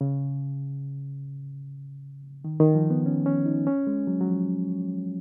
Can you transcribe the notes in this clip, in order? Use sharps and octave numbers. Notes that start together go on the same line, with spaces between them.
C#3
D#3
D#3
F3
B3
C#4
C#4
D#4
C#4
G#3
F#3
F#3
F3